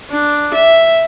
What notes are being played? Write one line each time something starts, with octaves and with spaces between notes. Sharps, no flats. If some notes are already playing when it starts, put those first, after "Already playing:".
D4
E5